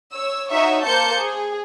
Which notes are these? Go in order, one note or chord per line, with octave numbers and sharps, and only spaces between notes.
C#5 E6
D#4 F#4 C#5 E5 C#6
A#3 A#4 C5 A5 G6 C#7
G#4